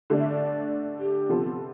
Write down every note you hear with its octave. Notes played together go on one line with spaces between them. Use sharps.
D3 A3 D4
E5
D5
G4
C3 F3 B3 F4 A4